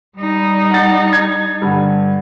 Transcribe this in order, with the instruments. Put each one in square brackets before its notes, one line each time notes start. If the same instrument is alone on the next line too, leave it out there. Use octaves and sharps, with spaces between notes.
[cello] G3 D#4
[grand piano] F#5 A6
G#6
G2 D3